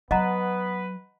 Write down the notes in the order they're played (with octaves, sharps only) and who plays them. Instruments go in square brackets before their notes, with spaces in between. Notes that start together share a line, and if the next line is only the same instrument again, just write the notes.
[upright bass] F#3 [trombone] B3 [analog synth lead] B4 [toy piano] D#5 F#5 A#5